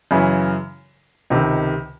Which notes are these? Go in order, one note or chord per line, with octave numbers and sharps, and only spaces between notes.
F#2 C#3 E3
C#2 C3 D#3